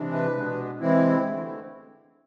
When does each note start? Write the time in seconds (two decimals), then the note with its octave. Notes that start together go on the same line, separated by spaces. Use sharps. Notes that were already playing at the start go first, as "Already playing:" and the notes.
Already playing: C3 E3 G#3 D4
0.13 B4
0.36 B2 G#3 B3 D4
0.80 C3 E3 G#3 C4 E4
1.24 D3 A3 C4